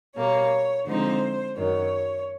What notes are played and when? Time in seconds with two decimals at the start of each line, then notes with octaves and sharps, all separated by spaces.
0.16 B2 G3 A#3 C#5
0.86 D3 F3 G#3 C4 D#4 C5
1.56 F#2 D#3 F#3 C#5